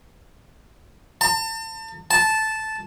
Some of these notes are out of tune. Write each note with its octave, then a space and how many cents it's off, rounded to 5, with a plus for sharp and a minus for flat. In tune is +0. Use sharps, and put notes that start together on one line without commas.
A5 +35
A5 -10